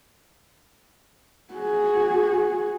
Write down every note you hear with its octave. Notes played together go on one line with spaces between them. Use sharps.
F#4 G#4